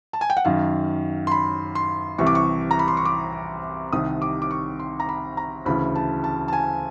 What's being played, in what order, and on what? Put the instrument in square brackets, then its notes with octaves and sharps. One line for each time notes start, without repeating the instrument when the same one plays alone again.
[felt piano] A5
G#5
G5
F#5
F#2 D#3 F5
C6
B5
C6
C2 C3 E3 C#6
D6
C#6
A#5
B5
C6
C#6
D6
C2 C3 D#3 D#6
D6
D6
C#6
C6
A#5
B5
A#5
D2 C#3 E3 B5
A5
A5
A5
G#5